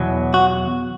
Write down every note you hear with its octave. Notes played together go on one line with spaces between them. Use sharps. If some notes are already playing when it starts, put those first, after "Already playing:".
Already playing: E2 B2 F#3
F#4